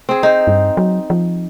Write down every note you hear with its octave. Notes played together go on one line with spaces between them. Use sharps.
C4 G#4
D#4 C5
G2
F#3
F3